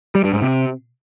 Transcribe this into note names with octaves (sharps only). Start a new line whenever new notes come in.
G3
G2
G#2
C3